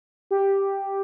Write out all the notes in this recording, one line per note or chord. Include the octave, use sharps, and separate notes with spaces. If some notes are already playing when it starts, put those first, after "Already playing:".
G4